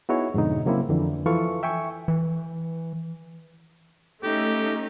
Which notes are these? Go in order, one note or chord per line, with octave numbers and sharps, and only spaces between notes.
B3 D#4 E4 F#4 G#4 C#5
F2 G#2 B2 D3 D#4
C#3 F#3 A#3 C4 E4
F2 D3 E3
E3 F3 F4 A4 F5 C#6
E5 G5 G#5 C#6
E3
A3 C#4 D#4 G4